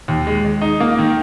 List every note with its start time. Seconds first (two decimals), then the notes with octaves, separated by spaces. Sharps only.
0.08 D#2
0.27 G#3
0.45 G#3
0.61 D#4
0.80 A#3
0.98 D#3